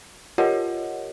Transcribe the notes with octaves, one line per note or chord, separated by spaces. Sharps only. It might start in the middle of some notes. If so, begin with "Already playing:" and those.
F4 G4 A#4 C#5 D#5 F#5